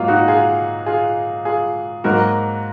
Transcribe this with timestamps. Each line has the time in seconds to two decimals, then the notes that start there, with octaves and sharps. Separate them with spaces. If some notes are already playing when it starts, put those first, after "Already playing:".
Already playing: G#2 F#3 A#3 F4
0.08 D#4 F#4
0.28 F4 G#4
0.86 F4 G#4
1.45 F4 G#4
2.04 G#2 F#3 A#3 F#4 A#4